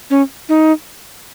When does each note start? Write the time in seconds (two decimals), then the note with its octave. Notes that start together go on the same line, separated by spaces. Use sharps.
0.10 C#4
0.49 D#4